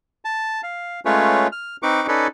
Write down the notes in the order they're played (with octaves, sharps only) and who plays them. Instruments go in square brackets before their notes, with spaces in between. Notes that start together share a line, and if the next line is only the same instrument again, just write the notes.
[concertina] A5
F5
G#3 A3 C#4 F4 B4 C#5
F6
C4 D#4 B4 C#6 D6
C#4 D#4 A4 B4 C#5 D5